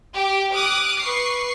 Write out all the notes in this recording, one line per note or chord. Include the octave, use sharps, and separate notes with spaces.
G4
D6 D#6 F6 F#6
B4 C#6 C7